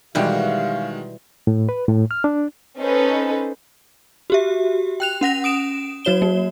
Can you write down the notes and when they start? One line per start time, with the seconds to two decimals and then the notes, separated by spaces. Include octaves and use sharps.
0.15 B2 D#3 E3 G3 G#3 F#4 G4 F5
1.47 A2
1.69 B4
1.88 A2
2.11 F6
2.24 D4
2.79 C#4 D#4 A4 B4 C5
4.30 F#4 G4 E5
5.00 G5 F#6 F7
5.21 C#4 F#5 A#6 F7
5.44 D#6 D7 E7
6.05 F#3 F#4 C#5 E7 G7
6.22 A#3